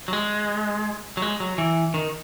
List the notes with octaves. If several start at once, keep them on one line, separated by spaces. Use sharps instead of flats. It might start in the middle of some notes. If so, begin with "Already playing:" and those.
F#3
G#3
F#3
G#3
F#3
E3
D#3